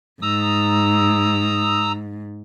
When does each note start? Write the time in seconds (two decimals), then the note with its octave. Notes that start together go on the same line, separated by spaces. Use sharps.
0.22 G#2 A#5 D#6 E6